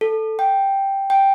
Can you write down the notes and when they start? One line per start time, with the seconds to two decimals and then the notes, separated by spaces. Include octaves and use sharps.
0.01 A4
0.39 G5
1.10 G5